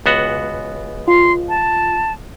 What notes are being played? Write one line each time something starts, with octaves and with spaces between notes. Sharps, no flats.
C#2 B3 F#4
F4 C6
A5